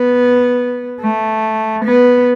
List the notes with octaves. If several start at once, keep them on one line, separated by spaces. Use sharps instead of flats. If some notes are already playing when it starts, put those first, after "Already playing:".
Already playing: B3
A3
B3